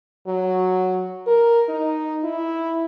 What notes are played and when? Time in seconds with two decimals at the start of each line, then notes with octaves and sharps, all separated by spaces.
0.27 F#3
1.27 A#4
1.69 D#4
2.24 E4